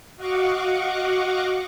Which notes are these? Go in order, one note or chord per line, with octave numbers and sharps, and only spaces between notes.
F#4 D#5 F5 F#5 C#6 D6